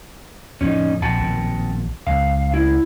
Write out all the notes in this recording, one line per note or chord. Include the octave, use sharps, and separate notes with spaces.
F2 A2 D3 C#4 D#4
A#1 C4 F#5 A5
A#1 B2 D#3
C#2 F5
E4